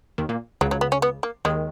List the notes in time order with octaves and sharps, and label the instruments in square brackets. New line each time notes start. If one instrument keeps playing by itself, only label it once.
[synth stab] D#2 D#3
A#2 A#3
[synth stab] C#2 C#3 [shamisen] F#3
[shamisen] F#3
B3
C#4
B3
A#3
[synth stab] D#2 D#3 [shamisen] G#3